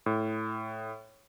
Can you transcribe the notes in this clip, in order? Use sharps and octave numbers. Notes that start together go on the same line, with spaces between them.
A2